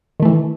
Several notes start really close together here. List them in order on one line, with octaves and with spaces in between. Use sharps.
D#3 A3 E3